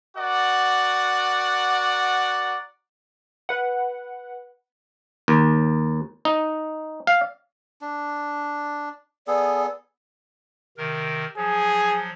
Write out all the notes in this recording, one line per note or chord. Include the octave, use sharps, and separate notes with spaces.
F#4 A#4 D5 F#5
B4 F#5
D#2
D#4
F5
D4
B3 G#4 A4 D5
C3 D#3 A#4
F3 F#3 G#4